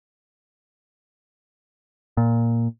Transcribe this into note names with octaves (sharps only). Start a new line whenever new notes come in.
A#2